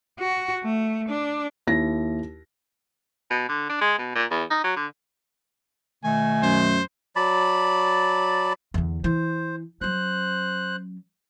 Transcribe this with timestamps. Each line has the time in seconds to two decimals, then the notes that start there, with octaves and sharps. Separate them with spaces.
0.20 F#4
0.64 A3
1.09 D4
1.67 D#2 E4 A#6
3.31 B2
3.49 D3
3.69 D4
3.81 G#3
3.98 B2
4.15 A#2
4.31 E2
4.50 D#4
4.64 F#3
4.76 D3
6.04 B2 D#3 A3 G#5
6.42 F#2 C5
7.16 F#3 D5 A5 B5
8.74 E2 D3
9.04 E3 C5
9.81 F#3 C#4 C5 F#6